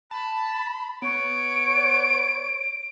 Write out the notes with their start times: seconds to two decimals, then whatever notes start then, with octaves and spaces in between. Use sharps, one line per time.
0.11 A5 B5
1.02 B3 C#5 D7